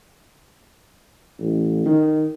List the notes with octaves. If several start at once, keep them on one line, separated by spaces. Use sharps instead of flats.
A1
D#3